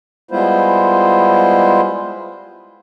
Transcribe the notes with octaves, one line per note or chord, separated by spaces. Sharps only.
G3 G#3 B3 E4 F4 C5